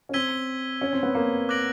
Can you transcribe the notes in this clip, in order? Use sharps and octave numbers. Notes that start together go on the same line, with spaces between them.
C#4
C4 E6 G#6 B6 D#7 G7
C#4
C4
B3
A#3
D6 F#6 A#6 D7 F#7